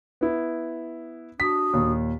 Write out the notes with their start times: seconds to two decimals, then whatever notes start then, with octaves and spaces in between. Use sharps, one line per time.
0.21 B3 E4
1.40 D4 F#4 D#6 B6
1.73 D#2 A#2